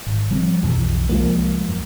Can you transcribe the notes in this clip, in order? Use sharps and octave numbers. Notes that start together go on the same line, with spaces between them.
G#1
F3 G3 C4
B1 F2 E3
C2 F3 G#3 A#3
F#2